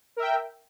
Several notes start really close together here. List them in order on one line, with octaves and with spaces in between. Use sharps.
A#4 E5 G5